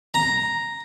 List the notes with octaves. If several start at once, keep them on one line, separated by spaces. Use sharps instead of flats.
A#5